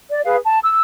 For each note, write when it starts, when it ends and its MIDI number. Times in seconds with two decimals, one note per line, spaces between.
0.10 0.22 74
0.24 0.36 68
0.24 0.36 71
0.24 0.36 77
0.44 0.59 81
0.63 0.81 88